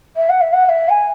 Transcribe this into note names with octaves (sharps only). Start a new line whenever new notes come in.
E5
F#5
E5
F#5
F#5
E5
G#5